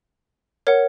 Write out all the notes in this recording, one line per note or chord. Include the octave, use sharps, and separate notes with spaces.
A#4 C#5 F#5